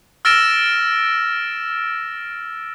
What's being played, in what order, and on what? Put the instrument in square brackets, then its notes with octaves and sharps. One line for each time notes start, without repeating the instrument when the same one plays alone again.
[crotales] E6 F6 A6 A#6 D7 E7